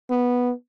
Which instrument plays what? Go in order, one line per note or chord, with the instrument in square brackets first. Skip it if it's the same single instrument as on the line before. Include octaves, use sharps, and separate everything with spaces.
[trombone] B3